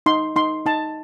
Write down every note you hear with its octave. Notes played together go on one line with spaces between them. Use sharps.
D#4 C6
D#4 C6
D#4 A5